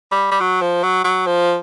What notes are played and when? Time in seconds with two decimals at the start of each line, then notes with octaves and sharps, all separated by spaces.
0.12 G3
0.31 G3
0.40 F#3
0.61 F3
0.83 F#3
1.04 F#3
1.27 F3